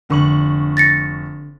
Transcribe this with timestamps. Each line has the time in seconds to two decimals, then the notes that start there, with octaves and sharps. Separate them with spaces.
0.10 F1 D3 C#6 F#7
0.77 A6 A#6 C#7